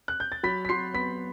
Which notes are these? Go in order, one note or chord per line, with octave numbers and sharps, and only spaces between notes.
F#6
G6
A6
F#3 B5 B6
B6
F#3 C6 C7
B3 B5 B6